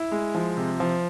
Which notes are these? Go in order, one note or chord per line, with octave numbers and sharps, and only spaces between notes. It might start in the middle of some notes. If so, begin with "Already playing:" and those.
Already playing: E4
G#3
F3
C3
F3